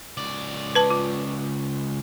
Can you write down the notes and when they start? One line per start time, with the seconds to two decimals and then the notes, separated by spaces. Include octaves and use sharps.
0.17 C#2 D5
0.75 B4 A5
0.90 F4